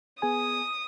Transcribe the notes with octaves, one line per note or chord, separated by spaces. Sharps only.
B3 G#4 G#5 D#6